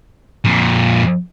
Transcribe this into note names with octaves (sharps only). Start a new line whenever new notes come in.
F2 A#2